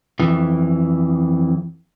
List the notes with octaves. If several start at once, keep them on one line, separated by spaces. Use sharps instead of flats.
F2 E3